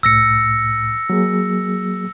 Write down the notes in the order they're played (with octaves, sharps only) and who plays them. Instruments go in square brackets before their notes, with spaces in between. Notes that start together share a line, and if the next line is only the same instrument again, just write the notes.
[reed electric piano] C2 A2 [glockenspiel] E6 A#6 C#7
[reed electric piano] F#3 A#3 G#4